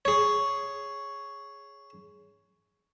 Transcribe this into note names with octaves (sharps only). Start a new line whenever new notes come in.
G#4 C#5